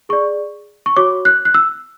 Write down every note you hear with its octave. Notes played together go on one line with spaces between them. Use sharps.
G#4 D5 C#6
C#6
F#4 C#5 D6
F#6
F#6
E6